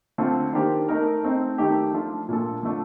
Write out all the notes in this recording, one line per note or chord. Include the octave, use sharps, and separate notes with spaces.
D3 A3 C4 F4
D#3 A#3 D4 G4 C5
A3 D#4 A#4
A3 C4 D#4
D#3 A3 D#4 G4
F3 A3 D4 F4
A#2 A3 D4 A4
D3 F3 A3 D4